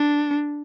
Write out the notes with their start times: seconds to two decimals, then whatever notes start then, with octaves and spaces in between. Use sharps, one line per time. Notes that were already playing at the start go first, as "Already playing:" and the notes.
Already playing: D4